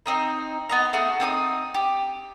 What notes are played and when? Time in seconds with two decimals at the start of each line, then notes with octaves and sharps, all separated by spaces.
0.06 C4 D#4 A#5
0.69 B3 D#5 A#5
0.93 A3 F#4 G#4
1.20 C4 D#4 D6 D#6
1.74 G4